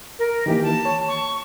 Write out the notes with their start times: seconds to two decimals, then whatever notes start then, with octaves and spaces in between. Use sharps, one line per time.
0.18 A#4
0.46 D#3 E3 A#3 G4
0.63 A5
0.85 C#5
1.08 C#6